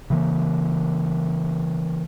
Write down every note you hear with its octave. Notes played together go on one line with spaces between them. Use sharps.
C#3 E3 A#3